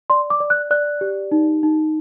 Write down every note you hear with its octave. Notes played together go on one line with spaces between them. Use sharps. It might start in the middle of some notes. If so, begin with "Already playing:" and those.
D5 C6
D6
D5
F#6
D5 F#6
G4
D#4
D#4